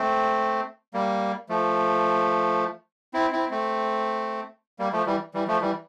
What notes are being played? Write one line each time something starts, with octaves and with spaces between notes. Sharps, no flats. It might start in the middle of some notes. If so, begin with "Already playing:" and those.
Already playing: A3 C4
G3 A#3
F3 A3
C4 E4
C4 E4
A3 C4
G3 A#3
F3 A3
E3 G3
E3 G3
F3 A3
E3 G3